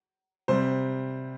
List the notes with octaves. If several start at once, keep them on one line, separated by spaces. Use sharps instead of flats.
C3 G3 C5